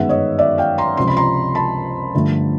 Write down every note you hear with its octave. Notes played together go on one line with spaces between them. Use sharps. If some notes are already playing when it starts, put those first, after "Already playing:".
Already playing: G1 F#2 D#3 G#3 B3 E5 F#5
C#5 D#5
D5 E5
F5 G5
A#5 C6
C#2 C3 F3 C6
B5
A#5 C6
A5 B5
G2 D3 F3 A3